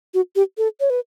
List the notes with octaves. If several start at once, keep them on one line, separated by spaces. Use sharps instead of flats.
F#4
G4
A4
C#5
B4